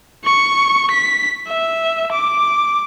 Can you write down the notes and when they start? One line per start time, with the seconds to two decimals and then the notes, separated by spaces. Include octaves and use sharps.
0.25 C#6
0.91 B6
1.47 E5
2.12 D6